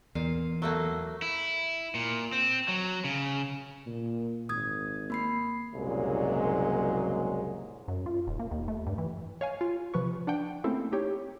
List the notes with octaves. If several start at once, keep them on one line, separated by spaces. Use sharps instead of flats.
E2 A#2 F5
F#3 A3 A#3
E4
A#2
C4
F#3
C#3
A#2
G#1 D#6 G#6
A#3 B5 C7
F#1 C2 A#2 F#3 G#3
F#2
F4
D#1
A#3
D#2
A3
G2
E3
C#5 F5 G#5
F4
C3 F3 B4 C#6
D4 F#5 G5
A3 A#3 C4 C#4 E4 A4
D#4 G4 C#5